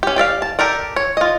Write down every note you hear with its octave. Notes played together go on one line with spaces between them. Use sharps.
C#4 G4
G4 D5 E5 F5
A5
G4 A4 A#4 D5
C#5
F4 D#5